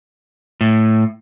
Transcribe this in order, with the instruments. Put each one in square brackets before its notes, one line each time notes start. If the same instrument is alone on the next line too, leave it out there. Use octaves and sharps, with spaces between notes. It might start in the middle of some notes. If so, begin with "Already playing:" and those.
[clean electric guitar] A2